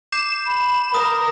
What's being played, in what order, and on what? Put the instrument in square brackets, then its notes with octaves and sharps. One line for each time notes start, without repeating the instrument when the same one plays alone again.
[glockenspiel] D6 G6 C7 [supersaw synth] E7
[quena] B5
[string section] A#4 [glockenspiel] D#6